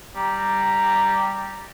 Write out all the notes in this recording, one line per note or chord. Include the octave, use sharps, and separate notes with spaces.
G3 A#5